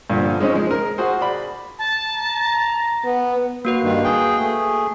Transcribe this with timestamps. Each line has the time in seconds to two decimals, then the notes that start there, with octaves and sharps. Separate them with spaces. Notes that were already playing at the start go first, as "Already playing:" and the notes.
0.10 G2 A#2 D3 F3
0.40 G#3 C4 C#4 D#4
0.52 F3 G#3
0.71 A#4
0.98 F#4 G#4 C5
1.21 D5 B5
1.79 A5
2.11 A#5
3.05 B3
3.65 A#3 F#4 B4
3.83 G2 D#3
4.04 G#4 G5
4.39 A3 G#4